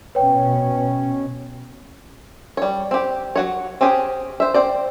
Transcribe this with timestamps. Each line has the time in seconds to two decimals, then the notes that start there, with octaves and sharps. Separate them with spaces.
0.15 B2 C#4 B4 C#5 G5
2.57 G3 C#5
2.91 C4 G4
3.36 F#3 F#4 C#5
3.81 C4 C#4 G4 G#4
4.40 C5 E5
4.54 C4 C5 D5